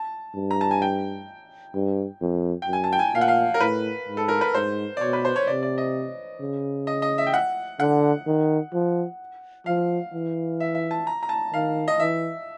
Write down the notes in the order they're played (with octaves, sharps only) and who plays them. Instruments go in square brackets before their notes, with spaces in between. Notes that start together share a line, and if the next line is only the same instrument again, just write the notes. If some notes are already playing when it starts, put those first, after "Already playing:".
Already playing: [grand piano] A5
[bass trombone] G2
[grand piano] A#5
A5
G#5
G5
[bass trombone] G2
F2
[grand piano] G5
[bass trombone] F#2
[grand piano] G#5
A5
G5
G#5
[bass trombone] A#2 [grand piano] F5
[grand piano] F#5
F5
A#4
[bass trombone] A2 [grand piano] B4
[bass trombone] G#2
[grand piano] A4
A#4
B4
[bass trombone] G#2 [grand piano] C5
[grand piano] D5
[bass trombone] B2 [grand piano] C#5
[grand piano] B4
C5
C#5
[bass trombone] C3 [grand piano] D5
[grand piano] D5
D#5
[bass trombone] C#3
[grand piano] D#5
D#5
E5
G5
F#5
[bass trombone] D3 [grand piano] F#5
[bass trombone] D#3
F3
[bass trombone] F3 [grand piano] F5
[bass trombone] E3
[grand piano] E5
E5
A5
A#5
A#5
A5
[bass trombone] D#3 [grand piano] F5
[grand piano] D#5
[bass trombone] E3 [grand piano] E5